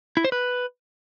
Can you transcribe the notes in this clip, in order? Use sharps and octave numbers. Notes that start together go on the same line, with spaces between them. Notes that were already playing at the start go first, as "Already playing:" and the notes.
E4
C5
B4